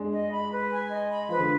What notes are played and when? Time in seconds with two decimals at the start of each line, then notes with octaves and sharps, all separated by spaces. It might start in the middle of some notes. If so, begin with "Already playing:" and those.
Already playing: G#3 D4
0.12 D#5
0.32 B5
0.51 B4
0.71 G#5
0.90 D#5
1.10 B5
1.29 F3 B4
1.39 D3